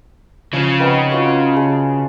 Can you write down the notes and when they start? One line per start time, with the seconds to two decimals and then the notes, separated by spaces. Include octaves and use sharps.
0.53 C#3 F3 C#4
0.80 B3 C4 D#4
1.12 F4 F#4 C#5
1.56 G#4 A5 C6